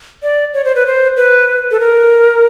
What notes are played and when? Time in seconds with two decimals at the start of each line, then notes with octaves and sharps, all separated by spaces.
0.23 D5
0.54 C#5
0.65 C5
0.75 B4
0.86 C5
1.17 B4
1.71 A4
1.80 A#4